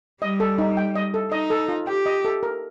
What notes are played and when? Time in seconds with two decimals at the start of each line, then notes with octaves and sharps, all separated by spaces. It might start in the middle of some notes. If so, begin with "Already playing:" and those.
0.22 G3 D#5
0.40 A4
0.58 D#4
0.77 G5
0.95 D#5
1.14 A4
1.32 D#4 D#5
1.50 A4
1.68 F4
1.87 G4 G5
2.06 D#5
2.25 A4
2.43 A#4